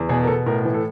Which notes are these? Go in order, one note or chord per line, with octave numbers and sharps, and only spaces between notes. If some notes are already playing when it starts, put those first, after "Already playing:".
Already playing: E2
B2 G#4
A#4
B2 A4
A2 A#4
E3
A4